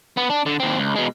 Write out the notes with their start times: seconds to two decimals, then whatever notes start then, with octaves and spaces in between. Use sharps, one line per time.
0.17 B3
0.30 D4
0.46 D3
0.60 D#2 C4
0.78 C#2
0.96 B2 G#3